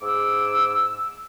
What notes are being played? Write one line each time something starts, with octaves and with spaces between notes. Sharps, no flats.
G#2 G#4 D6 E6